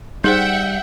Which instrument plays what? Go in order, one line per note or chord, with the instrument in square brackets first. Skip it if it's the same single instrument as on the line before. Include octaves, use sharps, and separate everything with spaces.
[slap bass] G3 [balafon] D#4 G#4 C5 [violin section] E5 F#5 G5 [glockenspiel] G6